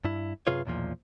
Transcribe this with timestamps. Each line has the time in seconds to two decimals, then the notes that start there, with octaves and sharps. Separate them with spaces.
0.04 G2 E4
0.47 F#2 C3 F4 G#4 B4 C#5
0.65 B1 E2 A#2 F3